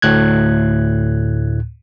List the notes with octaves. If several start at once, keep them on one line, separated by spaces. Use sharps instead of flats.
D2 A2 F#6 G#6